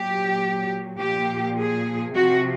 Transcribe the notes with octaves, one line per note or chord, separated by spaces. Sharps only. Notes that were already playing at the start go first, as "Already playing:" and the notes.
Already playing: A#2 F#3 G4
A#2 F3 G4
G#4
C3 F3 F#4